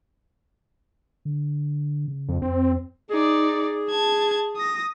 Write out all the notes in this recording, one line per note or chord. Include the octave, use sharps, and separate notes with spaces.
D3
C#3
F2
F2 C4
D#4 G#4 D5
A5 G#6
D#6 A#6